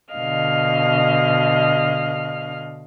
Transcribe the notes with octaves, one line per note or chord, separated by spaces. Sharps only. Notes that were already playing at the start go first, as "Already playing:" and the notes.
B2 D3 D#5 F5 F6